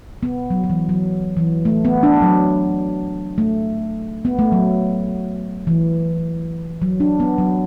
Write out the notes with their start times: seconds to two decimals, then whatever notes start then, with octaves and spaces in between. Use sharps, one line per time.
0.23 B3
0.50 F#3
0.64 F#3
0.70 E3
0.89 F#3
1.37 E3
1.65 A3
1.85 B3
2.03 D4
2.22 F#3
3.38 A3
4.25 B3
4.39 A3
4.52 F#3
5.67 E3
6.82 F#3
7.00 D4
7.20 B3
7.38 F#3